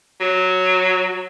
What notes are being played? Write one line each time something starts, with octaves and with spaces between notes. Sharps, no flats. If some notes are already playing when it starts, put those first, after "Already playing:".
F#3